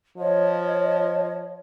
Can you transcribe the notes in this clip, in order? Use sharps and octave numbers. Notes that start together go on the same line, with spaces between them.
F3 C#5 D#5